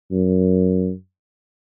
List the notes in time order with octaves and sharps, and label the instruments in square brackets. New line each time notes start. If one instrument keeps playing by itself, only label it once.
[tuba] F#2